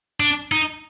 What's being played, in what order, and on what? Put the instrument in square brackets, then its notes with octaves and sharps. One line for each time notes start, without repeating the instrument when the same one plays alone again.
[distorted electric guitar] D4
D#4